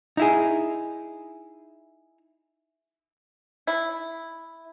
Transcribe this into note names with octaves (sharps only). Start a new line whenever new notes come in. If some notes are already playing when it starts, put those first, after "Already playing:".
D#4 E4 G#4
E4